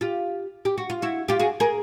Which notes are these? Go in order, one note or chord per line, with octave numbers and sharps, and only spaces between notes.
F4 G4
G4
F#4
F4
E4 F#4
F4 G4
F#4 G#4
G#4 A#4